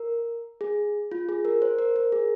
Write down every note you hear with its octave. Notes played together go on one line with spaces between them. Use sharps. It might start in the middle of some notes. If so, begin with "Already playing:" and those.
Already playing: A#4
G#4
F4
G#4
A#4
C5
A#4
A#4
G#4